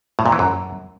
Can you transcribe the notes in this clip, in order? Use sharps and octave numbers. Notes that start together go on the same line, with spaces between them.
A2
A#2
E3
F#2